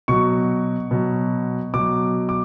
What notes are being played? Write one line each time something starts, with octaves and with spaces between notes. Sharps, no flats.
B2 F#3 C#6
B2 F#3
B2 F#3 D6
D6